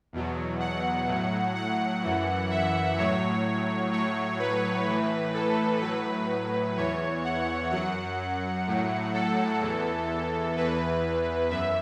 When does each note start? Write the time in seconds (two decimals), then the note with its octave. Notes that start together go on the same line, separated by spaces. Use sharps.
0.13 E2 B2 F#3
0.60 F#5
1.08 A2 F#3
1.55 F#5
2.03 F#2 E3
2.50 E5
2.97 A2 F#3 C#5
3.92 A2 F#3 C#5
4.39 B4
4.87 A2 E3
5.34 A4
5.81 A2 F#3 B4
6.77 E2 E3 C#5
7.24 F#5
7.71 F#2 F#3 F#5
8.67 A2 F#3
9.14 A4
9.61 E2 E3
10.55 E2 E3 B4
11.50 F#2 E5